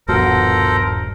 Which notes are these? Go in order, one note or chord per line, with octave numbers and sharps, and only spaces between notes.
D#1 G2 B2 F3 A4 A#4 C5 F#5